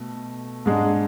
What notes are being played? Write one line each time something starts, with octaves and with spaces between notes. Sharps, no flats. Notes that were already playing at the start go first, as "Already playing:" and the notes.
Already playing: B2 A3
G#2 G#3 D4 G#4